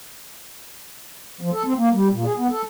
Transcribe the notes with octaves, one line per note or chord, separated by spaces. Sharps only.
F3
A4
C4
A#3
G3
A#2
G#4
B3
A4